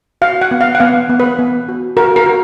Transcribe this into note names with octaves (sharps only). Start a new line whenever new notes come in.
F#4 F5
F#5
B3
F5
F#5
B3 F5
B3
B4
B3
F#4
F#4 A#4
A#4
F#4